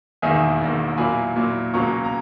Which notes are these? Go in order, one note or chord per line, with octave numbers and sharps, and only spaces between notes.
E1 E2 D#3 A#3 E5 G#5
E1 E2 D#3 A#3
A#2 F#3 A#3 E4 G#5 B5
A#2 F#3 A#3 E4
C#2 B2 F#3 A#3 C#4 A#5 C#6
A#5